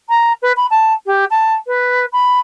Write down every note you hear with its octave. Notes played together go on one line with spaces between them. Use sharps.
A#5
B4
B5
A5
G4
A5
B4
B5